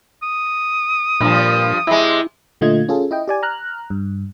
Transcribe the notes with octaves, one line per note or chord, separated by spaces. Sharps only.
D#6
G2 A#2 F3
C3 G#3 E4
A#2 D3 A3 F4 D#5 G#6
C#4 F4 G#4 A4
E4 D#5 G5
G4 D5 G#5
A#5 F6 F#6
G2